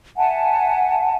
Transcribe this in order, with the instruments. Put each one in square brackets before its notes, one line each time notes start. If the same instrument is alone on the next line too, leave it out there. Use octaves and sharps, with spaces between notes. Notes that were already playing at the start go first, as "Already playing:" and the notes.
[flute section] E5 F#5 G#5 A5